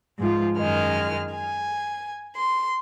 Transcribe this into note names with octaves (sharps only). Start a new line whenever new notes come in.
G#2 F3 F4
F#2 D#3 G#3 F6
G#5
C6